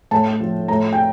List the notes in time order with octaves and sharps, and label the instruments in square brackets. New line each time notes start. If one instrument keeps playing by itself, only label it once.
[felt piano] A2 A5
F3
A2 A#5
G5